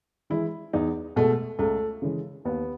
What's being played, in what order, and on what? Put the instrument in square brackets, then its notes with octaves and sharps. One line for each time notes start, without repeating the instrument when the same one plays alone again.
[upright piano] E3 G#3 E4
E2 D#4
B2 G#3 A3
C#2 A3
C#3 E3 G#3
D#2 B3